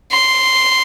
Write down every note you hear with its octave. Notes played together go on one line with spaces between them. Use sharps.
C6